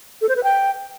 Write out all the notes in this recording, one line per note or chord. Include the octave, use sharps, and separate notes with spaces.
A4
C5
B4
G5